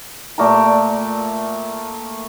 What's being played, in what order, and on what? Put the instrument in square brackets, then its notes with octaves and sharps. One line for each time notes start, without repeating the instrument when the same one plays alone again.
[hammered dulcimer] A#2 A3 D5 A#5